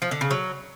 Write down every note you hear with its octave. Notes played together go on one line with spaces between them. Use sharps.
F3
D3
C#3
F#3